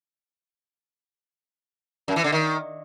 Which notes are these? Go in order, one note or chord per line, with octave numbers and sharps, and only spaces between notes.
F#2
E3
D3
D#3